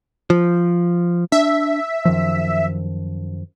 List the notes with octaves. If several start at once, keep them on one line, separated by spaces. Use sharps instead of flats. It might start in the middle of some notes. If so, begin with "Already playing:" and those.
F3
D4 E5
F#2 D#3 F3